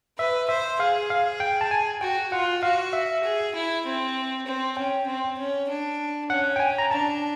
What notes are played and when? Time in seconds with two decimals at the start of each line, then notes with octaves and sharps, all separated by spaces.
0.18 B4 E5
0.48 C5 E5
0.80 G#4 F5
1.10 F5
1.40 G5
1.61 A5
1.71 G#5
2.01 F#4 G5
2.32 F4 F#5
2.63 F#4 F5
2.93 E5
3.24 G#4
3.55 E4
3.85 C4
4.47 C4
4.77 C#4 G5
5.07 C4
5.38 C#4
5.69 D4
6.30 C#4 F#5
6.56 G5
6.60 G#5
6.78 A#5
6.91 D4 A5